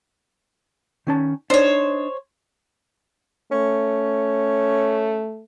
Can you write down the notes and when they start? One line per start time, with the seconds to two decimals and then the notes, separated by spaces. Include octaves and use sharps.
1.07 D#3 C#4 A5
1.50 D4 D#4 C5 C#5
3.52 A3 C#4